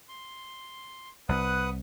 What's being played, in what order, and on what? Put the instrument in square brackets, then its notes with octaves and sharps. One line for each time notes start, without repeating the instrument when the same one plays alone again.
[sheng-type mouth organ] C6
[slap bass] C2 [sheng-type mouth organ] B4 F#5 D#6